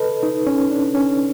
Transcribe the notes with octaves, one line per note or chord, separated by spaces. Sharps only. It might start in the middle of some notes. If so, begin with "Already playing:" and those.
Already playing: A4 B4 D#5
D#4
C#4
D4
C#4